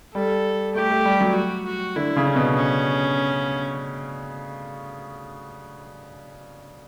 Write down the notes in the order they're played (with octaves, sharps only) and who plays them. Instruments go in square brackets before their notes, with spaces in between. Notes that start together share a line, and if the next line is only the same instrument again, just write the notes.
[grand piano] G3 [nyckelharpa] A4
[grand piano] A3 [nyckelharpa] G4
[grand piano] A3
G3
F#3
[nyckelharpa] F#4
F#4
[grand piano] D3 [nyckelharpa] E4
[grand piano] C#3
[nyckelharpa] C#4
[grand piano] B2
[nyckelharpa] C#4